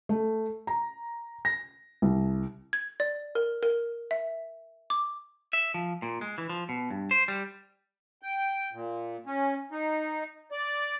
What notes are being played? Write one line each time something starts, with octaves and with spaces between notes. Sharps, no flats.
A3
A#5
A#6
C2
G#6
D5
A#4
A#4
E5
D6
E5
F3
A#2
G#3
E3
F3
B2
G2
C5
G3
G5
A#2
C#4
D#4
D5